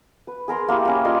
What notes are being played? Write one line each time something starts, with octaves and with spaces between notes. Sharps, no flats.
B4
G#4 A#4 A#5 C6
A#3 E4 G4
A#3 C#4
F4 D5 D#5 C6